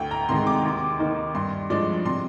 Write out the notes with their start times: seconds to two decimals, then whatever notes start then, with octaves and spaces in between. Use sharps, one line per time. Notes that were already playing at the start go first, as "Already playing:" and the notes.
Already playing: D2 G5
0.11 A#5
0.29 C3 D#3 G#3 D#4 C6
0.47 D6
0.64 D#2
0.99 D#3 A#3 D#4
1.35 G2 C6
1.70 F3 G#3 D4 D5
2.05 C3 C6